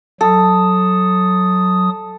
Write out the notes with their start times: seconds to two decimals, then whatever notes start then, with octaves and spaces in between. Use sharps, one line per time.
0.21 F#3 A4 D#6